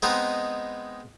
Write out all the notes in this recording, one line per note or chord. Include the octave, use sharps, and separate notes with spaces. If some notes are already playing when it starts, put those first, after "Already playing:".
G#3 B3 C4 D#4 B4